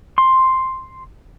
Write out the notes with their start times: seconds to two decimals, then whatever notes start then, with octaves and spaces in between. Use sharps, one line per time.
0.18 C6